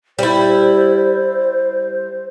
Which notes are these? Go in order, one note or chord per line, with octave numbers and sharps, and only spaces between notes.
G3 E4 C5